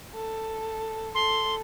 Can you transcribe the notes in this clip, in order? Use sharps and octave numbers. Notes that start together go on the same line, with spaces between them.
A4
A4 C6